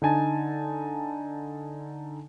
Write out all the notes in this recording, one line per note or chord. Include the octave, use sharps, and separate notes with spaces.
D3 D#4 G#5 A5